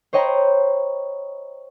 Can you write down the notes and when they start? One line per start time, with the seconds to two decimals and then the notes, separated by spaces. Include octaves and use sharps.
0.13 C5 C#5 D#5 G5 A#5 B5